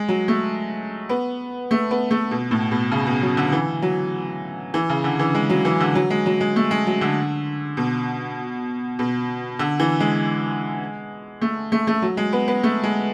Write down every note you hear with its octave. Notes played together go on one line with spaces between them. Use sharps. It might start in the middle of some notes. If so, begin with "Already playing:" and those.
Already playing: G#3
F#3
A3
B3
A3
B3
A3
B2
A2
B2
C#3
B2
F#3
D3
E3
F#3
E3
C#3
D3
E3
G#3
F#3
E3
D3
F#3
G#3
F#3
G#3
A3
G#3
F#3
D3
B2
B2
D3
E3
G#3
A3
A3
A3
F#3
G#3
B3
B3
A3
G#3